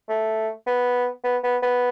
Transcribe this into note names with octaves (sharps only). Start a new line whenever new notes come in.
A3
B3
B3
B3
B3